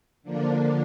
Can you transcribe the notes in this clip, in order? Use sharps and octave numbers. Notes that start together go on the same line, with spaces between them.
D3 F3 A#3 D4